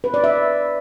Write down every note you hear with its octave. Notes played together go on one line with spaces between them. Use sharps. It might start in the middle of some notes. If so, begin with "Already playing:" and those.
B4
D5
E5